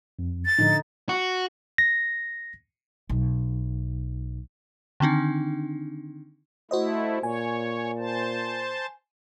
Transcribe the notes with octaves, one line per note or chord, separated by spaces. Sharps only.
F2
A6
A2 D3 F3 D#4
F#4
A#6
B1
D3 D#3 C4 D4 D#4
A3 E4 F#4 C5 D#5
A#2 C#5 G#5
C5 A5